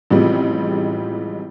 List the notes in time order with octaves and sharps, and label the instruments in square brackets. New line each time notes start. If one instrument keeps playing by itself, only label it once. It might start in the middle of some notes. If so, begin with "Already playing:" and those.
[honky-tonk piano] A1 C3 F3 G3 G#3